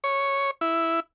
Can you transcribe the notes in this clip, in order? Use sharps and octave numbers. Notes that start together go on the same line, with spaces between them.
C#5
E4